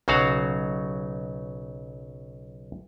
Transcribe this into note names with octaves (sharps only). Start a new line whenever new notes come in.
B1 C#3 F#3 F#4 F5